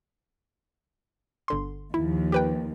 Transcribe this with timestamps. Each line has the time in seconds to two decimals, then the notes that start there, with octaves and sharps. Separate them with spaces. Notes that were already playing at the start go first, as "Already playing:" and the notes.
1.48 G1 D3 C6
1.94 D#2 F3 E4
2.32 G4 B4 G5